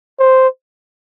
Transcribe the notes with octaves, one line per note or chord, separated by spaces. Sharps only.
C5